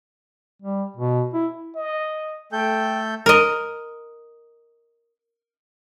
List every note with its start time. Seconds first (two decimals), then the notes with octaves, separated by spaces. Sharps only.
0.62 G3
0.97 B2
1.33 E4
1.76 D#5
2.52 A3 A4 G5 G6
3.26 A#4 D#5